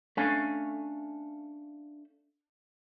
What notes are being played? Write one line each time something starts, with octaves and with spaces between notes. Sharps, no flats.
A3 C#4 D4 F5 G#5